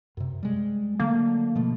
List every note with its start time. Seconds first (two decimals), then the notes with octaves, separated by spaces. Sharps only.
0.17 F#2 C3
0.43 G3 G#3
1.00 D3 F#3 A3 A#3
1.55 B2 F3 A3